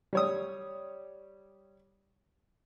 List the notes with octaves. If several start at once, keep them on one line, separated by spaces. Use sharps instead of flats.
G3 C#5 D#6